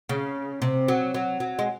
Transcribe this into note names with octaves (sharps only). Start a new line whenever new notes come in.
C#3
C3
F#3
F#3
F#3
G#3